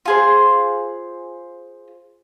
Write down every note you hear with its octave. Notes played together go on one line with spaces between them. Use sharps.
F4 G#4 C5